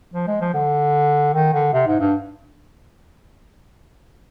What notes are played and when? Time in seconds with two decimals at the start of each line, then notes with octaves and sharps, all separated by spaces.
0.14 F3
0.27 G#3
0.41 F3
0.54 D3
1.34 D#3
1.53 D3
1.73 C3
1.87 G#2
2.00 G2